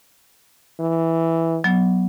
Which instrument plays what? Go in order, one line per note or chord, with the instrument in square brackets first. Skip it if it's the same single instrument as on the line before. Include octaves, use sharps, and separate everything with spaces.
[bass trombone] E3
[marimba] F#3 B3